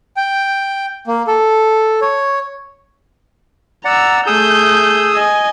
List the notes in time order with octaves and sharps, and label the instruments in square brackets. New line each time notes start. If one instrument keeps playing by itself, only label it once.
[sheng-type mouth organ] G5
A#3
A4
C#5
[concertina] D5 F#5 [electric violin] A#5 E6
[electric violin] A3 G6 [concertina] G#4 D#6 E6
[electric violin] D#5 G#5